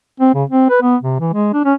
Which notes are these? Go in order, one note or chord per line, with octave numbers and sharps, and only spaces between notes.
C4
C#3
C4
B4
B3
C3
E3
G#3
D4
C#4